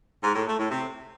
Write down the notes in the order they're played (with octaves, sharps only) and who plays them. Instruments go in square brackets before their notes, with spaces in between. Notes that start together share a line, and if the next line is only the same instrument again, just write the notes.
[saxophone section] G#2
A2
A3
A2
C3